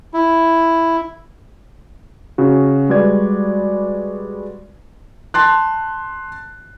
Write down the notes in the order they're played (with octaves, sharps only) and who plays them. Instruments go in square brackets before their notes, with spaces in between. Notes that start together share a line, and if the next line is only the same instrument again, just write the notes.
[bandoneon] E4
[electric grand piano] C#3 F#4
G3 G#3 F#4 B4 D5 G#6
[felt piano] A5 C6 F#6